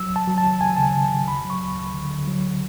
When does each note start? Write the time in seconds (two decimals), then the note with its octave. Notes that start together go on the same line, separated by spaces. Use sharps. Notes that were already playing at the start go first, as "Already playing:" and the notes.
Already playing: F#3 E6
0.10 C#2
0.16 A5
0.27 F#3
0.38 A5
0.44 C#2
0.61 C#2 G#5
0.76 C#3 A5
0.83 G#5
0.94 C#3
1.05 A5
1.11 C#2
1.28 D2 B5
1.45 F#3
1.50 C#6
1.61 D2
1.77 D2
1.94 D3
2.10 D3
2.27 F#3